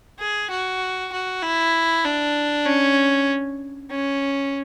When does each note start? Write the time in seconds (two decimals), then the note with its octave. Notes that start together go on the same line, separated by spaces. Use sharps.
0.20 G#4
0.51 F#4
1.12 F#4
1.43 E4
2.05 D4
2.66 C#4
3.91 C#4